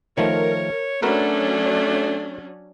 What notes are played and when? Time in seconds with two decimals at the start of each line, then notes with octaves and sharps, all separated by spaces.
0.18 D#3 F3 A3 A#4 C#5
1.02 F#3 A3 C#4 D4 F#4 A#4 B4